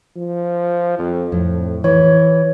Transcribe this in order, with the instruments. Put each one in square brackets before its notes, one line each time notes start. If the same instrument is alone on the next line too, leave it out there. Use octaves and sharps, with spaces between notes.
[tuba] F3
F2
[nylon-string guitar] F2 [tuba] A2
[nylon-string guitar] E3 [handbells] C#5